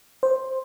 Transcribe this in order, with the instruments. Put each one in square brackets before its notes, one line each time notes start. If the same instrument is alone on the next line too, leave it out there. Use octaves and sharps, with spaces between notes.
[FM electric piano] C5